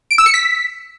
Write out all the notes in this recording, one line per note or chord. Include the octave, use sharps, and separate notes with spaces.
D7
E6
C#7
B6